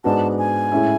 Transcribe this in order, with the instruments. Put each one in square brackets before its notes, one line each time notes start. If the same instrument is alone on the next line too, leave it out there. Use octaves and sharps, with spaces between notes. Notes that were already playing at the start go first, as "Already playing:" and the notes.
[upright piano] G#2 G#3 B3 D4 F#4 [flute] A5
[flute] G#5
[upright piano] A2 G#3 C#4 E4